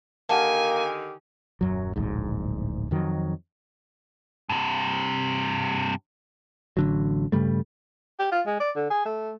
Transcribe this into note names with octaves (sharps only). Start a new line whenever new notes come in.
D3 D#3 A#3 G4 F#5 G#5 A5
D#1 F#2 F#3
D1 A#1 G#2
F2 D#3 F#3
G2 C3
A1 D3 F#3
G2 C#3 G3 A3
G4
F4
G#3
D5
D3
G#4
A3